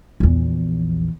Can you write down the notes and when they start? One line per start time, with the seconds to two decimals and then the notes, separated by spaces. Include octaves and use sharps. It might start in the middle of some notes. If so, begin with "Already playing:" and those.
0.20 A#1 E2